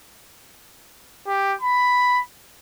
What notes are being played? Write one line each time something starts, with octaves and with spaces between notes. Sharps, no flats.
G4
B5